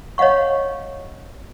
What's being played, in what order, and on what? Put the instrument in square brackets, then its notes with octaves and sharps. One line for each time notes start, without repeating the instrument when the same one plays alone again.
[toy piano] C#5 D#5 F5 F#5 C#6